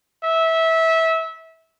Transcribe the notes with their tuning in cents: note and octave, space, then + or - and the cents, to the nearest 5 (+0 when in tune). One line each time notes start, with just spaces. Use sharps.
E5 -20